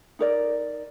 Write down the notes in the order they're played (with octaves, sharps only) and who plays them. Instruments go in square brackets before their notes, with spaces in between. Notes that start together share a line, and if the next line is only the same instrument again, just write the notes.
[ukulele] D#4 A#4 D5